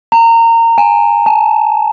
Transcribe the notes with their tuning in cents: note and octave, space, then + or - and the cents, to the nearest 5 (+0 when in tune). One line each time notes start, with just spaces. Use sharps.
A#5 -25
G#5 -15
A5 -35